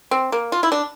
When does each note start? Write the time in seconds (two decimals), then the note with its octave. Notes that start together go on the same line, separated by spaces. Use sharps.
0.11 C4
0.32 A#3
0.52 F4
0.63 E4
0.72 D4